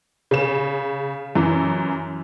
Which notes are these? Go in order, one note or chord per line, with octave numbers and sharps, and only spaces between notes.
C#3 E7
F#2 E3